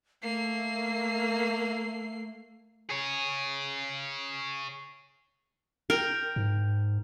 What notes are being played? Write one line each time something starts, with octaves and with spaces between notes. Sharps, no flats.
A3 A#3 C7
G#4 C#5
A#4 G5
G#2